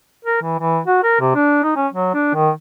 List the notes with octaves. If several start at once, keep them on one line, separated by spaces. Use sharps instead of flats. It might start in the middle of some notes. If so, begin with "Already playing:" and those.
A#4
E3
E3
F#4
A#4
C3
D4
D#4
C#4
F#3
D4
D#3